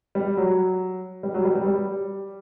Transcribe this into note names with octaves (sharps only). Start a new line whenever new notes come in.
G3
F#3
G3
F#3
G3
G3
G3